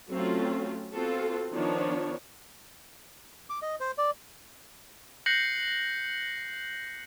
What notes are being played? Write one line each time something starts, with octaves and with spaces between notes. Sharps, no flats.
F#3 A3 C4 C#4 F4
B3 C4 F4 F#4 A4
D#3 F3 B3 D4 C#5
D6
D#5
C5
D5
F#6 G6 A#6 C7 C#7 F#7